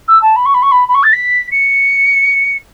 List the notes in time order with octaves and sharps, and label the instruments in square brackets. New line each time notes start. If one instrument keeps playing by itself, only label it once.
[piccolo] E6
A5
B5
C#6
B5
C#6
B5
B5
C#6
A6
B6
C#7